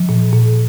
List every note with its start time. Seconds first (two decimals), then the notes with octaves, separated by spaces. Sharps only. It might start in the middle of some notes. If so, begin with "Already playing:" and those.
Already playing: F3
0.09 A#2
0.33 A#2